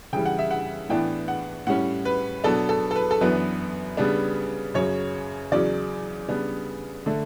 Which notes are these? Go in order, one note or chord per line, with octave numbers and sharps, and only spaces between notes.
C#3 E3 G3 G5
F#5
E5
F#5
A2 E3 B3 D4 G5
F#5
A2 G3 C#4 F#5
B4
B2 F#3 B3 D4 A4
A4
A4
B4
A4
F#2 E3 B3 D4 B4
C#3 G3 B3 D4
F#2 C#3 F#3 C#5
E2 C#3 F#3 C#4 D5
C#3 G3 B3 D4
D3 A3 D4